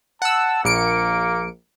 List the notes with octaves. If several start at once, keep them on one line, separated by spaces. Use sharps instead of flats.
F#5 A5 E6
A#1 A#3 C#7 D7